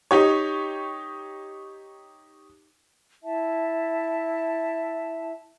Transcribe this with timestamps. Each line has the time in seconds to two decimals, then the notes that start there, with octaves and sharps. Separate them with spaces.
0.11 D#4 G4 C#5
3.23 E4 E5 A5